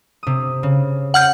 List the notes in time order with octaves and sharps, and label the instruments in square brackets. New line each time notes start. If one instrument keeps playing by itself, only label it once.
[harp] C3 D#6
C#3
[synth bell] F#5 F6 G6